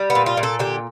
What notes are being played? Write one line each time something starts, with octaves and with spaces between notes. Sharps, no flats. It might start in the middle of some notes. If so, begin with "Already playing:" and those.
Already playing: G3
B3
A#2
F4
A#2
A4
D3 G4